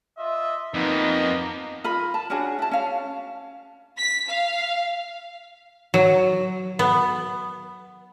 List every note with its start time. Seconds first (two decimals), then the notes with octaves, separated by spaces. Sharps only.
0.18 F4 D#5 E5
0.74 F2 A#3 B3 D#4 A#4 B4 D#5
1.84 F4 A#4 B5
2.14 A5
2.30 C#4 D4 F#4 G#4
2.59 E4 A5
2.71 C#4 F5
3.97 B6
4.28 F5
5.94 F#3
6.79 B3